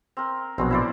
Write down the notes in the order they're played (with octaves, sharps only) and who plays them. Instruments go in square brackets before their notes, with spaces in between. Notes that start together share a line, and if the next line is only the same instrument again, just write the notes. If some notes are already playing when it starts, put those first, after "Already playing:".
[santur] C4 A#4
[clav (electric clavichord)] A#1 B2 F#3 [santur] C4
[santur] E4 C5 D5